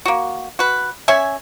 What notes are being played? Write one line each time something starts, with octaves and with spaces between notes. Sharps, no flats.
A#3 F#4
F#4 B4
C#4 C#5 E5 G#5